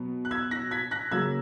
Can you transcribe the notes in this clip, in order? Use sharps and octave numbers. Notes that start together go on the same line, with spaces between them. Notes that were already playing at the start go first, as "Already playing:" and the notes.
Already playing: B2 F#3 B3
F#6
E6 G#6
F#6 A#6
G#6 B6
F#6 A#6
C#3 F#3 A#3 E6 G#6